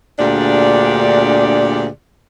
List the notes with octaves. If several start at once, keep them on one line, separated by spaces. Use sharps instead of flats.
D2 A#2 D4 G4 G#4 D5